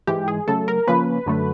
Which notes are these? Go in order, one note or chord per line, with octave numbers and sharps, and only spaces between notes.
G#2 E3 G#3 G4
G#4
C#3 F#3 A3 A4
A#4
C#3 F3 A#3 C#4 B4
F#2 D3 F#3 A3